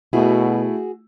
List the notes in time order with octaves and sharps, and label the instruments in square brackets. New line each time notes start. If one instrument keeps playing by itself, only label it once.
[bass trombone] B2 [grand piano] A3 E4 [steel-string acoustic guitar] F#4 G#4